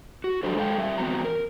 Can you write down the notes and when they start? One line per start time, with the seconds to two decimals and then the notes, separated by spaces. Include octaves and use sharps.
0.24 F#4
0.43 F#3 D4 G4 A4 C5
0.56 G#3 A4 F5 G5
0.78 G3 E5
0.98 E3 B3 C4 F#4 A#5
1.24 A#4